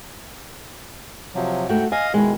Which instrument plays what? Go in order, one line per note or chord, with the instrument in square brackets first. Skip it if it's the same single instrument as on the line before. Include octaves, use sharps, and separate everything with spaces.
[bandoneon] C3 F3 F#3
[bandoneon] G#2 G5 [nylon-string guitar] A3 F#4
[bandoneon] D#5 F5 D#6 [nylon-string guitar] G#5
[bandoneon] B2 D#3 [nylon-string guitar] G#3 E4